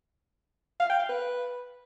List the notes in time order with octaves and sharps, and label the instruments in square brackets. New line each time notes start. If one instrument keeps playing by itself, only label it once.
[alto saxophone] F5
G5
F5
B4